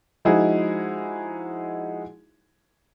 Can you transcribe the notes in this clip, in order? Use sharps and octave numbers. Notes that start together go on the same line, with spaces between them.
F3 G#3 D#4 E4 F#4 G#4